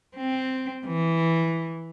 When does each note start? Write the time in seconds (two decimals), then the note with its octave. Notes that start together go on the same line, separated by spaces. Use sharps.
0.16 C4
0.85 E3